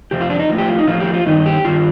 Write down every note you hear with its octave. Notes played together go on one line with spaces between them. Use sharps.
F2 C3 G4
F4
D4
D#4
A2 F3
G4
F4
D#4
A2 F3 F4
G4
F4
G2 D#3 D#4
G4
G2 D#3 F4